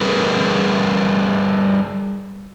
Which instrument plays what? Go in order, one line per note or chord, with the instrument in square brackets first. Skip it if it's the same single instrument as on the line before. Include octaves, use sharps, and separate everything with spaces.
[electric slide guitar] G3 G#4 A#4 B4